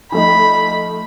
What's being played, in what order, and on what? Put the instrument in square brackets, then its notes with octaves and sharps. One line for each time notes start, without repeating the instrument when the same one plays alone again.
[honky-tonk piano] F3 A3 D#4 [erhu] B5